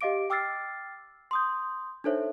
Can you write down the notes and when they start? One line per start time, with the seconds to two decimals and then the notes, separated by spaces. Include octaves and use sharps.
0.01 G4 D#5 F5 D6 D7
0.30 G5 D6 E6 F6 A6 C7
1.31 C6 D#6 G6
2.04 D4 D#4 A4 C5 C#5 E5